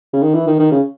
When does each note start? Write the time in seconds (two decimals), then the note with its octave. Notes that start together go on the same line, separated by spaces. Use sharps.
0.13 C#3
0.22 D#3
0.34 E3
0.47 D#3
0.59 D#3
0.71 C#3